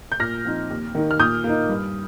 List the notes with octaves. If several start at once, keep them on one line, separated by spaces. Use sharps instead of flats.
G6
A#2 F6 A#6
F3 C4 D#4
D#2
D#3 A#3 D#4
F6
A#2 D#6 G6
A#3
D#4
G2